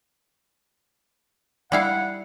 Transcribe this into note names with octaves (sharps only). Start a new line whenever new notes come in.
G3 E4 F5 F#5